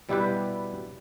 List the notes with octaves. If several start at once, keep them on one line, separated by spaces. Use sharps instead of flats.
B2 G3 E4 G4 B4